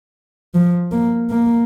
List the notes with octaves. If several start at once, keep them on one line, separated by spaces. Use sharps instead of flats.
F3
A#3
A#3